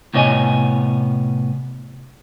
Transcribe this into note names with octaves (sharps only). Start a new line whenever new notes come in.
A2 C3 B3 C#5 D#5 G#5